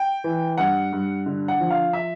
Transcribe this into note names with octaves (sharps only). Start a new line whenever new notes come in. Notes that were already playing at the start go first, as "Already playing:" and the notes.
Already playing: G5
E3
G2 F#5
G2
D3
F#5
F3
F5
E5